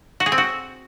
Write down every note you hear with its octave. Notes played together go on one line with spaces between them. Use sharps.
F#4
G#4
C4
F#4